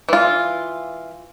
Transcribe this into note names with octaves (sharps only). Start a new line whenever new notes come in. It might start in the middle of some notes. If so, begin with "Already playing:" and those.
E3 F4